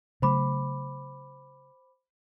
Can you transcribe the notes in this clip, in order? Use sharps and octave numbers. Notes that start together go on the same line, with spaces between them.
C#3 F#3 A3 C5 B5 D6